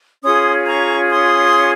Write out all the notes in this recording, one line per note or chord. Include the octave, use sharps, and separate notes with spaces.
C#4 F4 G#4 C6 D#6
A#5 C#6
C6 D#6